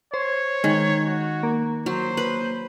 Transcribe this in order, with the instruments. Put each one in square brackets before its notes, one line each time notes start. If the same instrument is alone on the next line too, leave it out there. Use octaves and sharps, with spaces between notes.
[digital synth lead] C5 [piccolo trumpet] C#5
[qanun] D#3 [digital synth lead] G#3
[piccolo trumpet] F#4
[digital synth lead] A#3
[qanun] F#3 [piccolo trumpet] C5
[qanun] B4